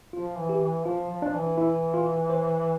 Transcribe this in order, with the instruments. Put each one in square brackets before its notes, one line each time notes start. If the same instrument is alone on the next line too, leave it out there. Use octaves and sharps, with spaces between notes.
[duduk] F3 [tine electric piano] F4
[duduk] E3
[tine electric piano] G4
[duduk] E3
[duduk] F3 [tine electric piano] F4
[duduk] F3
[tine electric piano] D4
[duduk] E3
[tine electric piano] E4
F4
C5